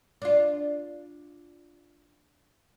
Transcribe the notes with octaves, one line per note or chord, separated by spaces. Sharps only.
D4 F4